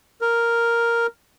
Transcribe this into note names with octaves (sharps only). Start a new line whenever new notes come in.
A#4